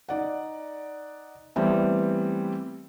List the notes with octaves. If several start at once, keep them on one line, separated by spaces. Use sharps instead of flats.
D#4 D5 F#5
E3 G3 A3 B3 C4 G4